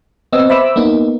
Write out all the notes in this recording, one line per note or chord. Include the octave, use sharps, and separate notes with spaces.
B3 C4 D#5 E6
C5 E5 B5 D6 E6
A#3 B3 D#4